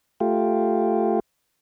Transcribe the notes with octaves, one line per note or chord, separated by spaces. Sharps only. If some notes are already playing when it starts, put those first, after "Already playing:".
A3 F4 G4